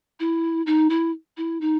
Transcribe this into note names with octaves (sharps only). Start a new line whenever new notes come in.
E4
D#4
E4
E4
D#4